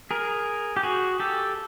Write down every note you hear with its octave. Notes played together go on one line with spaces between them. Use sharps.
G#4 A#4
G4
F#4 G#4
G4 A4